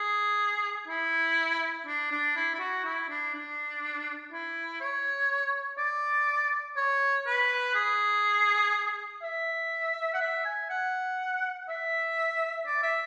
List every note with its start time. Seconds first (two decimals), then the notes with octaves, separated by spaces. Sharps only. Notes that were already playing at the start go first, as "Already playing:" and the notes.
Already playing: G#4
0.88 E4
1.87 D4
2.11 D4
2.36 E4
2.55 E4
2.59 F#4
2.85 E4
3.09 D4
3.34 D4
4.32 E4
4.81 C#5
5.78 D5
6.77 C#5
7.27 B4
7.75 G#4
9.23 E5
10.14 F#5
10.21 E5
10.45 G#5
10.70 F#5
11.68 E5
12.66 D5
12.83 E5